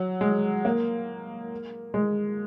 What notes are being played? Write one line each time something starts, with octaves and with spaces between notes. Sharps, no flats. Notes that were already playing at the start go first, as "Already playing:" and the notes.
Already playing: F#3
G#3
A#3
G#3